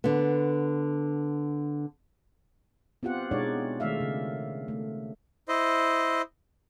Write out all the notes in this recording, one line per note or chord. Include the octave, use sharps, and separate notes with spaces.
D3 B3
B3 C4 F4 G4 F#5
B2 G#3 D4 D#4 C#5 D5
D#3 G#3 A3 D5 E5 F5
C#3
A3
E4 C5 D#5